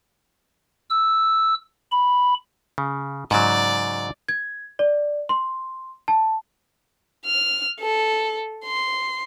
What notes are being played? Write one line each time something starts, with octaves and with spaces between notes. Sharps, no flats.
E6
B5
C#3
G#2 C#3 F#3 D5
G#6
D5
C6
A5
F6
A4
C6